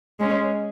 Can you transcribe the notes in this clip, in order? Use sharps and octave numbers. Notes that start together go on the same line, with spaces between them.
G#3 C#4